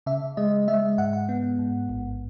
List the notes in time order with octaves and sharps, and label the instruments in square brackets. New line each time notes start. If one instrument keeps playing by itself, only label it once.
[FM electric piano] C#3 E5
G#3 D#5
G#3 E5
G#2 F#5
F#5
B3
G#2
A1